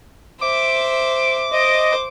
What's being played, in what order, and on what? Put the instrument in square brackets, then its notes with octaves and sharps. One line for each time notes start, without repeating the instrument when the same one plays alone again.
[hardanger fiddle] C5 E5 [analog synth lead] D6
[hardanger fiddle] C5 [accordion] D#5